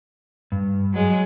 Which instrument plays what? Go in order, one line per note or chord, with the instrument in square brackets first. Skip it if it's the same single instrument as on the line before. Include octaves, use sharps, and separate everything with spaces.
[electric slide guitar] G2
[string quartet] F#3 G#3